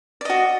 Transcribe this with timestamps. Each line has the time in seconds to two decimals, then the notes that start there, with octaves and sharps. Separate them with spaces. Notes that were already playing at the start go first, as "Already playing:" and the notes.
0.21 D5
0.25 D#5
0.30 F#4